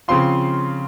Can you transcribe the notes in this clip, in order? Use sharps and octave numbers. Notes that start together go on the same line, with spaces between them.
C#3 F3 C4 F4 C6